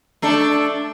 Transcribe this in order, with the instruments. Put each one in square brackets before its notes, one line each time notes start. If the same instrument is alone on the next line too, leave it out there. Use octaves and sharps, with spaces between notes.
[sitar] A3 D4 A4